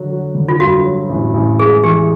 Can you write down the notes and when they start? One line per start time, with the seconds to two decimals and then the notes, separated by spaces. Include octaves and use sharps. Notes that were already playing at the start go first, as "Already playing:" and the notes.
Already playing: D3 F#3
0.10 F#3
0.35 D3
0.49 F4
0.60 G2 F#4
0.84 F#3
1.09 A1
1.34 A1
1.59 G#3 G#4
1.83 E3 G4